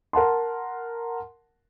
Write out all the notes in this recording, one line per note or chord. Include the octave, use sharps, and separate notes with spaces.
A#4 F#5 A5 C6